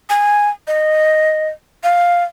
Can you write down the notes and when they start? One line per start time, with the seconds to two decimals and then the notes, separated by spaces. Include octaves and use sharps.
0.09 G#5
0.67 D#5
1.83 F5